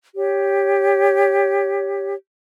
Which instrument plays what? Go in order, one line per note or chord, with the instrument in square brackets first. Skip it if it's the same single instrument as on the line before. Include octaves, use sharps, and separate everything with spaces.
[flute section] G4 C#5